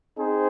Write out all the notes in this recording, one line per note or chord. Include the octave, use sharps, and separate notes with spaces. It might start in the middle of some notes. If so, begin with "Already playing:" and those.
C4 D#4 G#4 C5